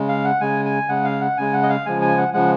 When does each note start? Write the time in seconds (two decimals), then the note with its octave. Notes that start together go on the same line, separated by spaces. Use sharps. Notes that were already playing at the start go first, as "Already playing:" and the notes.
Already playing: C#3 G#3
0.09 F5
0.24 F#5
0.41 C#3 G#3 G#5
0.65 G#5
0.89 C#3 G#3 F#5
1.05 F5
1.21 F#5
1.37 C#3 G#3 G#5
1.53 F#5
1.63 D#5
1.69 F5
1.86 C#3 F3 G#3 G#5
2.02 G#5
2.18 F#5
2.34 C#3 F3 G#3 F#5